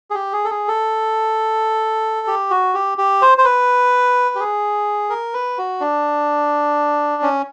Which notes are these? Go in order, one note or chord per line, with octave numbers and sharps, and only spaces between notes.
G#4
G4
G#4
A4
G#4
A4
G4
F#4
G4
G4
C5
C5
B4
G4
G#4
A#4
B4
F#4
D4
C#4